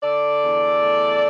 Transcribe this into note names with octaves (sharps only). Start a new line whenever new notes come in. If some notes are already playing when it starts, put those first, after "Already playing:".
D3 A4 D5
E2
A3